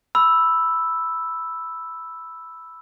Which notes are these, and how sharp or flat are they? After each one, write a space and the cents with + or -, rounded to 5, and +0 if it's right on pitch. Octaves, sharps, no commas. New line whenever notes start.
B5 +0 E6 +0